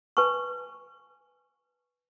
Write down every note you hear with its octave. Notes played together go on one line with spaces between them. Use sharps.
B4 G#5 A5 C#6